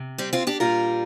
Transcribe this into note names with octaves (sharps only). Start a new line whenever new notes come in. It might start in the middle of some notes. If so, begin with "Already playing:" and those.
Already playing: C3
G3 C4
C4 F4
D4 G4
A#2 G3 F4 A#4